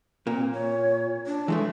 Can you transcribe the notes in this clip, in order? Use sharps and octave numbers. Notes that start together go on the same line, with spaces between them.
A#2 A#3 C4
C#5
D4
E3 G#3 A3